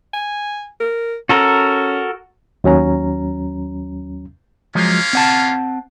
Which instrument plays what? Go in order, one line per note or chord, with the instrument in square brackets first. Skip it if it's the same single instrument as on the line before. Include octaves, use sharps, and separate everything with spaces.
[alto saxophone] G#5
A#4
[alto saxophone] C#4 [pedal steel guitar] F#4 A4 A#4
[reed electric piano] D#2 F#3 C#4 A#5
[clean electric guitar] F3 F#3 G#3 [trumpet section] A#3 C#4 F4
[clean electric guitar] C4 F#5 A5